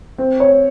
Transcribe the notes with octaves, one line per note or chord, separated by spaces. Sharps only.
C4
C#5